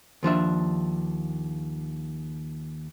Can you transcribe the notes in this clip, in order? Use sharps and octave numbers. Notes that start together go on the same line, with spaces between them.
D#2 F3 D4 E5